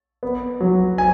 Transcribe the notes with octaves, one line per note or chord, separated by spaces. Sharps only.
B3
F#3
G#5